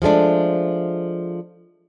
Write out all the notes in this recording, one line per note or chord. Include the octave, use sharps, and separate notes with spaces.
F3 G#3 A3 D4